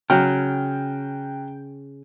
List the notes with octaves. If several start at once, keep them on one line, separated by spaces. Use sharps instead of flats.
C#3 F#3 G5 F6